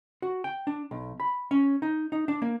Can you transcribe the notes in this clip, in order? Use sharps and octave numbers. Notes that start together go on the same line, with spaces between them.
F#4
G5
D4
B1
B5
C#4
D#4
D#4
D4
A#3